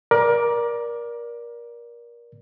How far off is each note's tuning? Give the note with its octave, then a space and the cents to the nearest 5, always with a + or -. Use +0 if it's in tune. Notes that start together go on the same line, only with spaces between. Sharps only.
A#4 +25 D5 +0